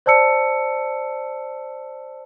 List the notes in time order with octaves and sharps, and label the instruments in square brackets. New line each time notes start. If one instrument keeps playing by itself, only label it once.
[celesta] C5 D5 A5 E6 C#7